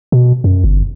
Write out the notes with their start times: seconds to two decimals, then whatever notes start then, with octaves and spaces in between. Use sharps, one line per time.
0.12 B2
0.44 F#2
0.64 G1